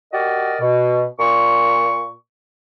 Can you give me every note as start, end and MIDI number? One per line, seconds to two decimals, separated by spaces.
0.13 0.56 66
0.13 0.56 67
0.13 0.56 70
0.13 0.56 74
0.13 0.56 75
0.60 1.05 47
1.19 2.12 46
1.19 2.12 85